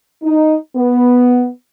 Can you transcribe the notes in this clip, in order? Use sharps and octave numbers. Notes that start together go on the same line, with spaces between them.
D#4
B3